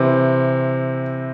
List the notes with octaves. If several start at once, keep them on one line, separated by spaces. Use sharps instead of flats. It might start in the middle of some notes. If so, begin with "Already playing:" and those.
Already playing: C3 E3 C4